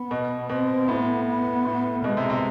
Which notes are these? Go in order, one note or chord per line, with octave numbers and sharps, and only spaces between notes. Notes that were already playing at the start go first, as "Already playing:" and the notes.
Already playing: B3
B2
B2 C4
A2 B3
B3
A2
B2 G#3
C3
C3